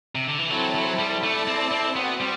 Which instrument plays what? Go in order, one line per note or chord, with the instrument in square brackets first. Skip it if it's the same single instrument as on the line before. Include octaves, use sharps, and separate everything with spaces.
[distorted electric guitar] C3
D3
E3
[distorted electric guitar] F#3 [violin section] C4 E4 A4 C5 E5
[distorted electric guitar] F#3
G3
[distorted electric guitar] A3 [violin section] E4 A4 D5 A5
[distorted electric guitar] C4
C4
[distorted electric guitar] B3 [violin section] C4 F#4 C5 F#5
[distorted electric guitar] G3